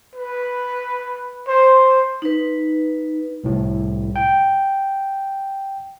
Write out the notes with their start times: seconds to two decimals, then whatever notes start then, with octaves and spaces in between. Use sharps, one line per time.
0.16 B4
1.48 C5
2.22 D#4 B4
3.44 C2 A2
4.16 G5